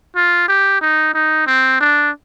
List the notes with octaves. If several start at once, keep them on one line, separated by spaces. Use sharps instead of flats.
F4
G4
D#4
D#4
C4
D4